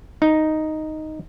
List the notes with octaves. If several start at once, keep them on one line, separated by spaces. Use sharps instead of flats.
D#4